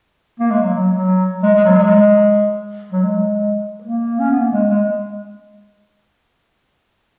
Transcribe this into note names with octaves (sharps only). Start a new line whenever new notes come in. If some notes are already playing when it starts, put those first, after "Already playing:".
A#3
G#3
F#3
F#3
F#3
G#3
G#3
F#3
G#3
F#3
G#3
A#3
C#4
B3
A#3
G#3
G#3